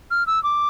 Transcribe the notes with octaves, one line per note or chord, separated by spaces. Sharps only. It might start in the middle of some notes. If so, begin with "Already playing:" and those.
F6
E6
D6